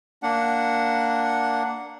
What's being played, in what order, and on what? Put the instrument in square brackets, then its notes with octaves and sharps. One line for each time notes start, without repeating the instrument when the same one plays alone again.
[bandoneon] A#3 D4 F#5